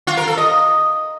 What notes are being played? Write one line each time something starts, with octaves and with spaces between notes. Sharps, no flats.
F4
A#4
A4
D#5